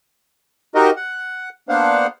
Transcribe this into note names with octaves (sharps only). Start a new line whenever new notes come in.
D#4 F#4 G4 A#4 D#5
F#5
A#3 B3 D4 C5 F5 F#5